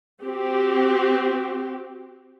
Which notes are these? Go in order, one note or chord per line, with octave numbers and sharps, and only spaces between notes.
C4 F#4 G4